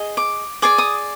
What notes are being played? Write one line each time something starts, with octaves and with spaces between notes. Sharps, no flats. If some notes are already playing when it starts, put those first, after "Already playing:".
Already playing: G#4 D#5
D6
G#4 D5 D6
D#6